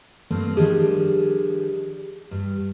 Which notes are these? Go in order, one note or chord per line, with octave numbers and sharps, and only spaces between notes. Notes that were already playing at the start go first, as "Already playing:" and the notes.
G2 A3 A#3 C4
D#3 F3 G3 D4 G4 G#4
G2